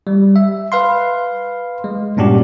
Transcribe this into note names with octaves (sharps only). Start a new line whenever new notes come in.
G3
E5
B4 F5 C6
G#3
G2 A#2 C#4 D4 F#4 G4